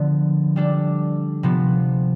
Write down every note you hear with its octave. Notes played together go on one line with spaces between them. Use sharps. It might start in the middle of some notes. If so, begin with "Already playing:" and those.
Already playing: D3 F3 B3
G3 D4 A4
C3 F3 B3